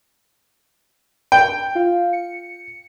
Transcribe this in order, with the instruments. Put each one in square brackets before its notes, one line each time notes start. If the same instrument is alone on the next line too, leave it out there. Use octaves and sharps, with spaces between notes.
[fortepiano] G5
[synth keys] F4 F5
C#7